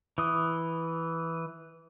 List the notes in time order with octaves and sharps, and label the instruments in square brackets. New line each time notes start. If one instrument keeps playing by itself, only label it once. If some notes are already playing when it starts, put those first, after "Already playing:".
[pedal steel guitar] E3 D#6